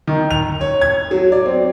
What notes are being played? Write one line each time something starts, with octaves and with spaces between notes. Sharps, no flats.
D#3
F7
C#5
G#6
F#3
D5
C4